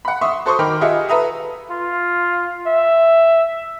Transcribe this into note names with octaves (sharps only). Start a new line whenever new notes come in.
F#5 B5
E5 C6 C#6 D#6
F#4 A4 C5 C6 C#6 D#6
D#3 A#4 G5 B5 D6 F6
F4 G4 G#4 D#5 E5 F#5
A4 B4 E5 A#5 D#6
F4
E5